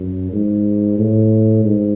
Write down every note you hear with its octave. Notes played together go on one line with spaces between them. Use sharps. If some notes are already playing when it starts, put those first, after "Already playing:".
Already playing: F#2
G#2
A2
G#2